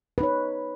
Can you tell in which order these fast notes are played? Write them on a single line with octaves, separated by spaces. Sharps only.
B4 D#4 C#5